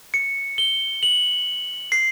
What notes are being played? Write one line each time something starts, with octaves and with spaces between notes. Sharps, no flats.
C#7
G7
F#7
C7